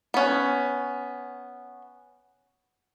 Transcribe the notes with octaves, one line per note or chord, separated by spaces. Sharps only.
B3 C#4